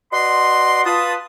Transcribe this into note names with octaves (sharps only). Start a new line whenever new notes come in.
F#4 B4 D5 D#5 C6
F4 B4 A5 D#6